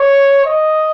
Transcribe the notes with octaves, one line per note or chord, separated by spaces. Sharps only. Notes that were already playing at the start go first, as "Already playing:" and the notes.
Already playing: C#5
D#5